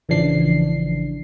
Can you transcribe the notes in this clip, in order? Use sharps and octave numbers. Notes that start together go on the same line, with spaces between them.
A1 C#3 E3 F3 D4 C7